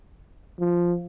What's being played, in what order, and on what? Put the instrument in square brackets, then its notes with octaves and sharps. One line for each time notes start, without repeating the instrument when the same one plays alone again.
[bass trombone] F3